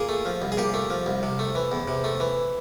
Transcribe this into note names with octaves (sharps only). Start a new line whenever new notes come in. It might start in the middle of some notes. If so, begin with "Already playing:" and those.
Already playing: A#2 G#4
A3
F3
C2
G#4
A#2 G4
A3
F3
C2
C3
A3
E3
E2
C3
A3
E3